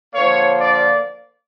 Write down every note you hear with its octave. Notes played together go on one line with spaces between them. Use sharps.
D3 F3 A#3 C#5
D5